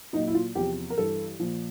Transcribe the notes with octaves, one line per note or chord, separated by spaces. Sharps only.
A#2 F#3 D#4
E4
F4
E2 C3 F3 G4
A#4
G2 E3 A4
A#2 F3